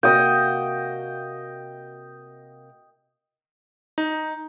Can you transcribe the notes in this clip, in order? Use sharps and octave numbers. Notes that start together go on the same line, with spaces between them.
C3 A#3 F#4 D#5 G5
D#4